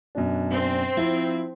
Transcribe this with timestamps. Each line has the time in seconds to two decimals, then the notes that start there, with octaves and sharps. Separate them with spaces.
0.15 F#2 B2 D4
0.52 C4
0.97 F3 E4